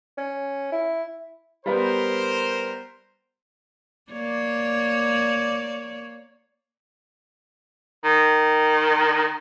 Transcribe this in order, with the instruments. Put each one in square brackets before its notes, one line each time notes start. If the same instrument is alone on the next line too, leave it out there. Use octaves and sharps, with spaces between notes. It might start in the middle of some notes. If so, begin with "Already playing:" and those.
[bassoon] C#4
E4
[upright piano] G3 B3 [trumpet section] A#4 C5
[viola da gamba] A#3 C#5 D5
[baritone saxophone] D#3